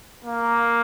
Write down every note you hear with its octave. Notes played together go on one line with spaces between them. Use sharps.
A#3